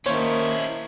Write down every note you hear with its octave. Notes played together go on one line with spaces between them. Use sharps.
D#3 A#3 C#4 E4 C5 C#5